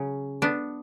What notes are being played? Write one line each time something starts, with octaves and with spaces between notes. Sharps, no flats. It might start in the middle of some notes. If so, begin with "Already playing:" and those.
Already playing: C#3 F#3 C#4
B3 D4